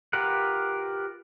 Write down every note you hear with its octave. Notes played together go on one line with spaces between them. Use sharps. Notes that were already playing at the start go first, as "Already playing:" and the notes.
F4 G4 A#4 B4 F#5